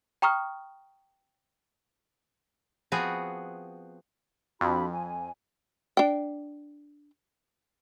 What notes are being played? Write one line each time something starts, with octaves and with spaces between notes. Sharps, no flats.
G5 A#5 C#6 D#6 F6
F3 B3 C4 F#4 G#4
F2 D4 F#4 B5
G#5
D4 G5